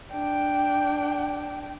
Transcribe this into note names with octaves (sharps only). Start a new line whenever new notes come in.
D4 G5